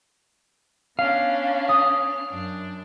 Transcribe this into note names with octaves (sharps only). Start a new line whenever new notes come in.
B3 C#4 D4 F5
D#6
F#2 D4